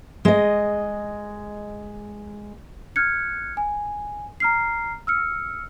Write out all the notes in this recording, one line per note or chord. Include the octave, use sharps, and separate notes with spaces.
G#3 D#5
F6 F#6 G#6 C#7
G#5
A#5 F6 C7
E6 F6 C#7